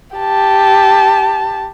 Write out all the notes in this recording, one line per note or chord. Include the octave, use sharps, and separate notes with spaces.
G4 A5